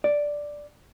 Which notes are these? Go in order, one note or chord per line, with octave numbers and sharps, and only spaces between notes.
D5